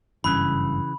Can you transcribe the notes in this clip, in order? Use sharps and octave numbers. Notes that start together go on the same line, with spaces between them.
F#1 G2 C#3 E3 C#4 B5